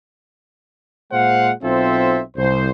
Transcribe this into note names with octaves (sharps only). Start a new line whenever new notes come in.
A#2 G#3 C5 F5 F#5
B1 C4 F4 A4 C5 E5
C2 C5